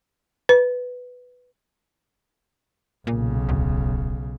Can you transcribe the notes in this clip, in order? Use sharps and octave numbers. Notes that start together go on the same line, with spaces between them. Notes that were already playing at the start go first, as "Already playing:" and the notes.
B4
B1 A#2 C#3
D1